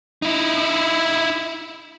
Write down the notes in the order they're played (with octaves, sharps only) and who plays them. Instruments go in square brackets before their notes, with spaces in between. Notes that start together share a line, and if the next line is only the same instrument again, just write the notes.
[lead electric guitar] D#4 E4